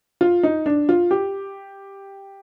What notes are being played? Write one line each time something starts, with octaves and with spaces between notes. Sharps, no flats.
F4
D#4
D4
F4
G4